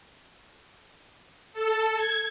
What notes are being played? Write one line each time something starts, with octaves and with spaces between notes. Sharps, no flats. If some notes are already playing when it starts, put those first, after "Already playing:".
A4
G#6